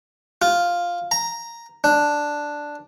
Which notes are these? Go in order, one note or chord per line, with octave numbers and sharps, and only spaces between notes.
F4
A#5
D4